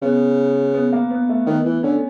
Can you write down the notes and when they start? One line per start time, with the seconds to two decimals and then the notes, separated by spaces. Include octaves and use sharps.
0.02 C#3 B3
0.74 B3
0.93 A#3
1.11 B3
1.29 A3
1.46 D#3 B3
1.65 E3
1.83 D3 C#4